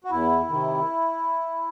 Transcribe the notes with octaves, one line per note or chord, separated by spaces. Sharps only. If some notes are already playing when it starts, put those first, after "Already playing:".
F#4
E2 E4
C3 D#3